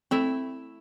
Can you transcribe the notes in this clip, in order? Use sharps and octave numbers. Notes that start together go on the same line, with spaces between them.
A3 C4 E4 E5